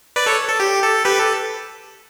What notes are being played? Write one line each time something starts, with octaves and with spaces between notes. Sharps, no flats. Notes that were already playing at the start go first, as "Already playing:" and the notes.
B4 D5
A4 C#5
A4
G4
A4
G4 B4
A4